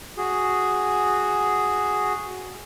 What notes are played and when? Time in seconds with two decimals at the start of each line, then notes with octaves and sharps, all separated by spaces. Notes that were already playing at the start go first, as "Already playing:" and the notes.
0.17 F#4 G#4